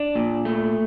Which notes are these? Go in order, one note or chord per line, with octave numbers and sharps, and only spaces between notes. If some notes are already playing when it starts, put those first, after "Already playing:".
Already playing: D4
A#2
A3